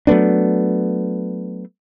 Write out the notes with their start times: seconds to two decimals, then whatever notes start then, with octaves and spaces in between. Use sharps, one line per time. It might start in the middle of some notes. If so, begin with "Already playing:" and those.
0.07 F#3 A3 B3 D4